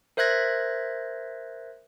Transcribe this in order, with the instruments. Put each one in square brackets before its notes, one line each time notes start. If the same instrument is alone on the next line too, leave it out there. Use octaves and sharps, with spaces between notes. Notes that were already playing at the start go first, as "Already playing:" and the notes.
[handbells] A#4 C5 E5 F#6 G#6 A#6